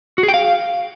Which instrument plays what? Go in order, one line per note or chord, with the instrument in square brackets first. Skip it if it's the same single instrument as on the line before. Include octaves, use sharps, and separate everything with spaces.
[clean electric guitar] F#4
G#4
G5
F5